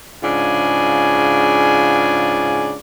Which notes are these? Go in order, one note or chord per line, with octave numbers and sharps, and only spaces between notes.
G#2 C#3 D4 F4 G#5